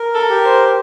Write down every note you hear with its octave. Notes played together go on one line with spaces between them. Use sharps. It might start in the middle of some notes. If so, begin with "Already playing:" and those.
Already playing: A#4
A4
G4
C5